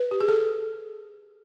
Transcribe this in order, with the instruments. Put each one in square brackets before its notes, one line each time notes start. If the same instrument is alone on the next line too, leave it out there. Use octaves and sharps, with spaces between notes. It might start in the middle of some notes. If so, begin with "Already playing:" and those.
Already playing: [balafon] B4
G4
G#4
A4